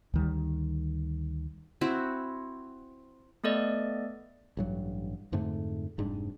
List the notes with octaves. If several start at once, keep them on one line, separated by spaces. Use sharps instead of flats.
D2 D#3 G3
C4 E4 F#4
A3 B3 A4 D5 D#5
A1 G2 F#3
F2 G#2 D3 A3
F1 G#2 G3 D4